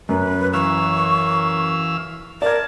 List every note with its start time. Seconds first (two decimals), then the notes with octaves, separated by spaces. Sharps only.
0.09 F#2 B4
0.53 E3 F5 C#6 E6
2.42 A#4 D5 A5 G#6